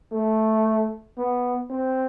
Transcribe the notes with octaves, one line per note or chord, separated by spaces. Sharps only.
A3
B3
C4